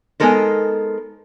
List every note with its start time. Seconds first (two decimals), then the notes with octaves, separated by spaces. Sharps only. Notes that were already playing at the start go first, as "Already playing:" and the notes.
0.20 G#3 B3 D#4 A4 A#4 C5